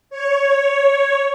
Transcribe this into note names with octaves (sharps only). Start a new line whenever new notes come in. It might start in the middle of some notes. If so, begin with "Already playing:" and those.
C#5